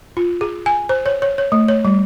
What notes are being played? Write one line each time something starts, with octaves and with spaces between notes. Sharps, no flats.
F4
G#4
G#5
C5
C#5
C#5
C#5
A3
C#5
G3